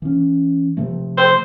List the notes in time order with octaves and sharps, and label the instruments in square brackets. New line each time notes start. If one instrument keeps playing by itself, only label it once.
[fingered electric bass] E3 C#4
C3 F3 A3
[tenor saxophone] C5